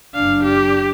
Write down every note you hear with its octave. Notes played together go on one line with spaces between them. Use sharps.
F#1 D4 F5
G4